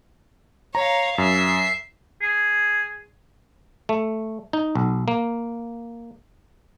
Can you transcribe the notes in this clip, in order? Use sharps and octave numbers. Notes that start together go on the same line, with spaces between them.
C#5 F5 A#5
F#2 E5 C7
G#4
A3
D#4
B1
A#3